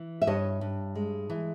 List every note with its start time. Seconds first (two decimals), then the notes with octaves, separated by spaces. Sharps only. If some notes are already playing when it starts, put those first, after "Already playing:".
Already playing: E3
0.22 E5
0.27 G2 C#5 D#5
0.61 G2
0.95 G#3
1.30 E3